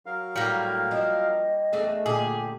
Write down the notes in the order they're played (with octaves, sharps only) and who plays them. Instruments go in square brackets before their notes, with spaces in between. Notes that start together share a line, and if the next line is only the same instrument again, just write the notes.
[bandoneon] F#3 A#4 F5
[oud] A2 [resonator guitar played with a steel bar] G3 A#3
[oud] F3 D4 [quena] D#5
[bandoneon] E2 [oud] A3 D4 G#4
[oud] A#2 [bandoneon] D3 G4 [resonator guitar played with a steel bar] G#4